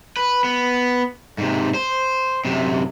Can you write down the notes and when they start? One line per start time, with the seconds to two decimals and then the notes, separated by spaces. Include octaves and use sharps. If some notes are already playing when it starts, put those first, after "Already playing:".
0.17 B4
0.44 B3
1.38 G#2 C3
1.74 C5
2.45 F#2 C3